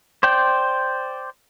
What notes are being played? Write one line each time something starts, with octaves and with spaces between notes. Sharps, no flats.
C5 D5 G5